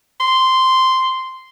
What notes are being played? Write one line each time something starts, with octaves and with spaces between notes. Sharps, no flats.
C6